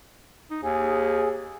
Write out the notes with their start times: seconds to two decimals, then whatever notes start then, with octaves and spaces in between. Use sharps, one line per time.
0.50 D#4
0.63 D#2 G#4